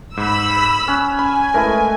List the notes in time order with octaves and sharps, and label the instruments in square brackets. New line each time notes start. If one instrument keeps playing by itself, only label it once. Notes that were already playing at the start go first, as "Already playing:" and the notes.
[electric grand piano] G#2 [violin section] B5 E6
[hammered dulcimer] C#4 [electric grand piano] F6 F#6
[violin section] G#5 [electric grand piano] B5
[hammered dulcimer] G#3 A3 E4 [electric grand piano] A#4 B4